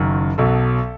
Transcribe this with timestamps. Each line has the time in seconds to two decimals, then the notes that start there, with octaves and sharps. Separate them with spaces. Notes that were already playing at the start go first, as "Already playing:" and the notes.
Already playing: F#1 F#2 D#3
0.38 B1 B2 F#3 A4